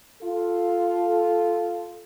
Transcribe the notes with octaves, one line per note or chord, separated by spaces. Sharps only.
F4 A4